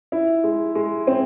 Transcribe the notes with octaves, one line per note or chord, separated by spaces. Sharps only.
E4
G#3
G#3
C4